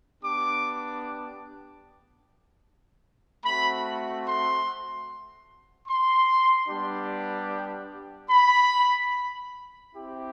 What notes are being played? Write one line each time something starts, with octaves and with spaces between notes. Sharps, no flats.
B3 D4 G4 D6
A3 C4 F#4 B5
C6
C6
G3 B3 D4 G4
B5
C4 E4 G4